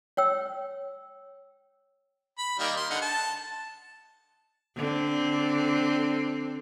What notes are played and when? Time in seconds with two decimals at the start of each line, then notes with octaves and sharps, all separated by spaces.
0.17 C#5 G5 E6
2.38 B5
2.59 D#3 G3 A#3
2.77 C6
2.90 D3 D#4 F#5
3.02 A5
4.77 D3 C4